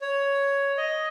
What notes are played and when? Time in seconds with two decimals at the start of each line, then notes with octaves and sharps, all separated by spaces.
0.01 C#5
0.77 D#5